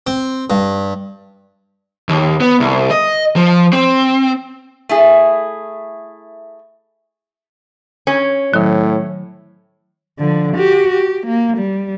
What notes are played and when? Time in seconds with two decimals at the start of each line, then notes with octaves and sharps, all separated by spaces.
0.07 C4
0.50 G2
2.09 D#2
2.41 B3
2.60 C2
2.91 D#5
3.36 F3
3.73 C4
4.89 A3 E4 G#4
8.07 C#4
8.54 A2 D#3 F#3
10.19 D3 F3
10.56 F#4 G4
10.91 G4
11.27 A#3
11.58 G3